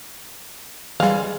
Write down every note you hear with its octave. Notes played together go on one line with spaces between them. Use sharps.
E3 G3 G#3 F5